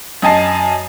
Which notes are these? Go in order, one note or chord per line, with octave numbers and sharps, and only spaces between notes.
F#2 D#5 G#5 A5 C7